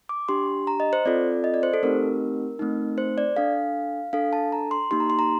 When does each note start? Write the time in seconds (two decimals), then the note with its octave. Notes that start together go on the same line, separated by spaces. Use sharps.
0.09 D6
0.28 D4 G4 C6
0.67 A#5
0.80 D#5
0.93 C5
1.05 C4 F4 A4 D5
1.44 D#5
1.54 D5
1.63 C5
1.74 A4
1.83 A3 C4 D#4 G4 A#4
2.59 A3 C4 D#4
2.98 C5
3.18 D5
3.36 D4 A4 F5
4.13 D4 A4 F5
4.33 A5
4.52 A#5
4.71 C6
4.91 A#3 D#4 G4 C6
5.00 A#5
5.10 C6
5.19 A#5